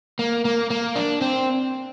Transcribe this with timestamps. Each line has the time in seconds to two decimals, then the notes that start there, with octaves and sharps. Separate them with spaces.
0.19 A#3
0.45 A#3
0.70 A#3
0.96 D4
1.21 C4